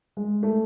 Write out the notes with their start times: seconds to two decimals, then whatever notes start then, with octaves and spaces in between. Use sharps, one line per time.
0.17 G#3
0.43 A3